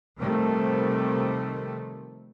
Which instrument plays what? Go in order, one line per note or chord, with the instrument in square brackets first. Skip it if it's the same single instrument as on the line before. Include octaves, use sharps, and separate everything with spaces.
[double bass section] C3 D#3 F3 G3 A3 C4